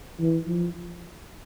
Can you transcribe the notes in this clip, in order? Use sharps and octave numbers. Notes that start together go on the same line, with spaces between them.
E3
F3